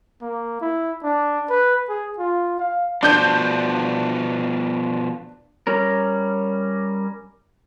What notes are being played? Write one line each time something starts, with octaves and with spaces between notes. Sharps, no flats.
A#3
E4
D4
B4
G#4
F4
F5
B2 F3 D4 G6
G3 C#4 A#4